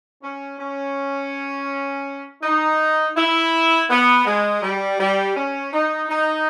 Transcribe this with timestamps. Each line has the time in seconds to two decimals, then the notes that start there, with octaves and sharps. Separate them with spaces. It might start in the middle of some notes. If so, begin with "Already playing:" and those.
0.23 C#4
0.59 C#4
2.42 D#4
3.16 E4
3.90 B3
4.26 G#3
4.62 G3
4.99 G3
5.36 C#4
5.73 D#4
6.10 D#4